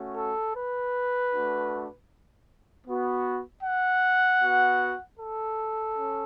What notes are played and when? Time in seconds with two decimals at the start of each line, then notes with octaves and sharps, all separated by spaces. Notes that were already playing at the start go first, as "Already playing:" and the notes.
Already playing: A3 C#4 F#4
0.17 A4
0.55 B4
1.32 A3 D4 F#4
2.86 B3 F#4
3.64 F#5
4.40 B3 F#4
5.19 A4
5.95 C#4